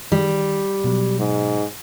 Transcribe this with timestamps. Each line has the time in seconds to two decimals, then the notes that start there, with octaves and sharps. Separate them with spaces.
0.12 D#3 G3
0.84 B2 F#3
1.19 G#2